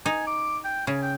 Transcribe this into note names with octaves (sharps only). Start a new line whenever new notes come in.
D#4 G#5
D6
G5
C#3 G#5
G5